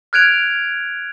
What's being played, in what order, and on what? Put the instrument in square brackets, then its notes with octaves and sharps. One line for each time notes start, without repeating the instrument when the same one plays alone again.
[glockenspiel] F6 F#6 G#6 D7 F7